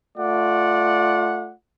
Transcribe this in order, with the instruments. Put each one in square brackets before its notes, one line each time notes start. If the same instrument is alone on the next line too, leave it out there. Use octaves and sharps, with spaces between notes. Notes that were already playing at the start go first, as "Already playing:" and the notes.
[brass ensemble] A3 F4 D5 F#5